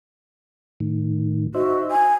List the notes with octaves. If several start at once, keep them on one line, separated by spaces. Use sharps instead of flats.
A2 D#3
D#4 F#4 C5 E5
G#5